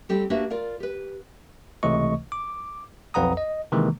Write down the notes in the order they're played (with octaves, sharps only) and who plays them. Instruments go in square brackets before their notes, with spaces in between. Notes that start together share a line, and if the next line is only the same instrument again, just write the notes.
[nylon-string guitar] G3 C4 G4 A4
A#3 D4 F#4 G4 B4 E5
F4 A#4 D5 F5
G4 B4
[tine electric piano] C#2 C3 E3 A3 D#5 C#6
D6
B1 F2 B4 F#5 A#5 D#6
D#5
C3 D#3 E3 G#3 A#3